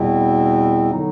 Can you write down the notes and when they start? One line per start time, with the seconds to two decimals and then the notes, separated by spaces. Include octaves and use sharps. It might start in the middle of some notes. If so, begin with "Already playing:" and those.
Already playing: E2 B2 G3 C4 E4
0.91 D3 F#3 B3 D#4